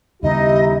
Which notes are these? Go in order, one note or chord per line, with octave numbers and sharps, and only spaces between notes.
D#2 C#3 G3 B3 D#4 E4 G4 D#5